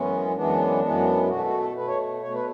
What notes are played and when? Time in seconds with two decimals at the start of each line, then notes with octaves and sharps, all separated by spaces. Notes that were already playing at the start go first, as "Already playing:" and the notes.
Already playing: F#2 E3 G#3 B3 C#4
0.35 F#2 E3 G#3 B3 D4
0.82 F#2 E3 G#3 B3
1.28 B2 A3 F#4
1.45 F#4
1.60 A4
1.75 B2 A3 B4
1.87 C#5
2.22 B2 A3 C#5
2.34 B4